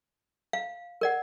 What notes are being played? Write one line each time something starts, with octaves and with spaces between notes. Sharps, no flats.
F5
A#4 D5 F#5